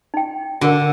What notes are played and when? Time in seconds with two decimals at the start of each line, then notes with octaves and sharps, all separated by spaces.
0.14 D#4 G5
0.61 D3 F#4 A#4